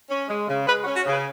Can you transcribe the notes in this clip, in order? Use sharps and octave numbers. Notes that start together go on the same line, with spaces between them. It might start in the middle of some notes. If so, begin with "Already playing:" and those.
C#4
G#3
C#3
G#3 B4
F#4
C#4
F#4
C#3 B4